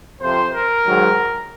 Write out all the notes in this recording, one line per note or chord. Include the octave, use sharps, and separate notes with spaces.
F2 C3 F3 C4 C5
A#4
G#2 D#3 F#3